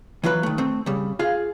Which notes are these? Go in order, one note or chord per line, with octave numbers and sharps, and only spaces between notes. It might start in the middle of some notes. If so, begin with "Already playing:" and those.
E3 F#3 F4 B4
D#3 A3
A3 C4
C#3 G3
F4 G#4 F5